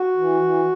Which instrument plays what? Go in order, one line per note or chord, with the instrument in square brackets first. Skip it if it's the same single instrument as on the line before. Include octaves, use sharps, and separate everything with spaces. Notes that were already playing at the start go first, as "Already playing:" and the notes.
Already playing: [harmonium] F#4
E3
E3